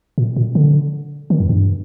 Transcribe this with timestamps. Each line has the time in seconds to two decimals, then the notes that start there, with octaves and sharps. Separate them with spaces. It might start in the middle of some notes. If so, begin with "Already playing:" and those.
0.18 A#2
0.36 A#2
0.55 D3
1.30 D#3
1.40 F2
1.49 G2